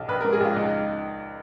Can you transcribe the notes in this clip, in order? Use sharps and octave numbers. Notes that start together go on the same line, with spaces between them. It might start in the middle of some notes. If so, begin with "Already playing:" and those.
Already playing: B1
A#1 B4
A#4
G#2
G#4
A#1 F4
C#2 D#4